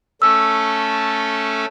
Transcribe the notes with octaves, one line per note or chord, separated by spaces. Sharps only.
A3 C#4 A4 E6